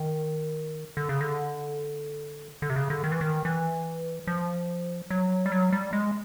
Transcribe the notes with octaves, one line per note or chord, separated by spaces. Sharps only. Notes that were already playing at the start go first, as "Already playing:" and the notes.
Already playing: D#3
D3
C#3
D3
D3
C3
C#3
D3
D#3
E3
D#3
E3
F3
F#3
G3
F#3
G3
G#3